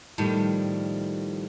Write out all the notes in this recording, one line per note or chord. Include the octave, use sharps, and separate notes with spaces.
A2 D#3 F3 G3